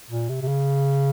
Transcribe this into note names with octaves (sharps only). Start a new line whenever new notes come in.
A#2
C3
C3
C#3